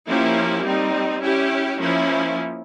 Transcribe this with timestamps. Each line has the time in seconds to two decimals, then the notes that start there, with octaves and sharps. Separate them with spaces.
0.08 F3 A#3 C#4 E4 G4
0.65 G3 C4 D#4
1.23 C#4 E4 G4
1.81 F3 A#3 C#4 E4